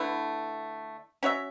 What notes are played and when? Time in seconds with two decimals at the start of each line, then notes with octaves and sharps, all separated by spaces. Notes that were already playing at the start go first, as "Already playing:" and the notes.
Already playing: D3 A3 E4 B4
1.23 C#4 F#4 C#5 E5